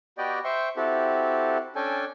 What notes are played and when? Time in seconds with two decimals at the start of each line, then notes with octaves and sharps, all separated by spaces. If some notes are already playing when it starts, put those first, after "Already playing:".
0.18 B3 F#4 G4 D5 D#5 G5
0.44 C5 E5 G5 C6 C#6
0.76 C4 E4 F#4 G4 A4
1.76 C#4 D4 A4 G5 G#5